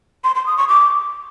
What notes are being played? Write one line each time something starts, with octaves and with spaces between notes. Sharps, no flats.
C6
C6
D#6
C#6
D6